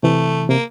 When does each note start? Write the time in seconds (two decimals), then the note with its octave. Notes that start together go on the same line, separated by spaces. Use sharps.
0.03 C3 E3 A3
0.49 C3 A#3